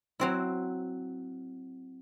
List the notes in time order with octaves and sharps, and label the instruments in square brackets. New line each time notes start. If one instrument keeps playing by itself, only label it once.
[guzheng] F#3 C4 E4